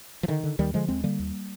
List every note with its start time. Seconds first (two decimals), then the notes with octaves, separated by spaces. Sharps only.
0.23 F3
0.28 D3 D#3
0.44 D3
0.59 D#2 D#3 G3
0.74 D3 F3 G#3
0.88 D#2 G#3 C4
1.04 D3 G3 A#3
1.19 D#2